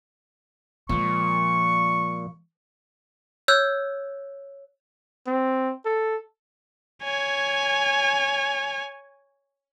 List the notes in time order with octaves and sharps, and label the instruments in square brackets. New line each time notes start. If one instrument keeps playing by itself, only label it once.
[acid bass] A#2 [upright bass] F3 G#3 [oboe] C#6
[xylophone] C#5 E6 F#6 G6
[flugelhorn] C4
A4
[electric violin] C#5 G#5